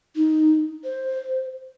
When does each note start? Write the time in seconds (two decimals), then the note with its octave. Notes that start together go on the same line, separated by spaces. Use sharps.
0.16 D#4
0.84 C5